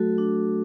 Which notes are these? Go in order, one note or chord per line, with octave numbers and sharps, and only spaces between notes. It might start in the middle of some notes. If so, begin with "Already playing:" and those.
Already playing: F#3 A3 F#4 A4
D4